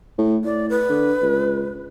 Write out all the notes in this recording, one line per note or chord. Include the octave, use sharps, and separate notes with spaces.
A2
A2 D5
B4
D3
C#2